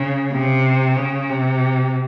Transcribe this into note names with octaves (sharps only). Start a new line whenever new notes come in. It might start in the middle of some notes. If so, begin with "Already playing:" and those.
Already playing: C#3
C3
C#3
C3